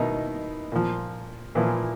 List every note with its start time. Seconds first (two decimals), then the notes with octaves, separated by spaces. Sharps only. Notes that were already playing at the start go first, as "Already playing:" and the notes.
Already playing: B2 D#3 D#4 E4
0.72 A#2 F3
1.55 A#2 E3 F3 E4